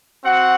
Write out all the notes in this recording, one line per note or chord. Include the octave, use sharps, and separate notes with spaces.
C4 F#4 F#5